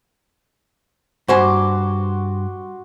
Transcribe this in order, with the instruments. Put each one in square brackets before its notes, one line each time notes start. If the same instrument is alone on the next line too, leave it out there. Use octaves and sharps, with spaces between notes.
[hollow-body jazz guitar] G2 C5 G#5 [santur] F#4 C6 D6